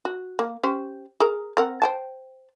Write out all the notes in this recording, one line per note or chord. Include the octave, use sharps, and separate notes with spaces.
F#4
A#3
C#4 G4 C5
G#4 A#4 A#5
C4 A#4 F#5
C5 G5 A5